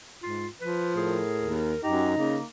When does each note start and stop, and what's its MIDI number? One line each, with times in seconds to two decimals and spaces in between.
0.23 0.47 44
0.23 0.48 65
0.61 1.19 53
0.61 0.94 71
0.95 1.50 45
0.95 1.66 68
0.95 1.80 70
1.42 1.74 39
1.83 2.16 42
1.83 2.45 63
1.83 2.08 67
1.83 2.40 82
2.17 2.39 49
2.17 2.45 58